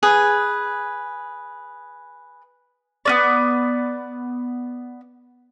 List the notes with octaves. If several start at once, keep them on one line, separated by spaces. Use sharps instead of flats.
G#4 B4 D#6
B3 C#4 D5